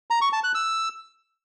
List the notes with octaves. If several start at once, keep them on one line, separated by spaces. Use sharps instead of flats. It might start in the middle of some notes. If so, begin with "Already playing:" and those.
A#5
C#6
A5
F#6
E6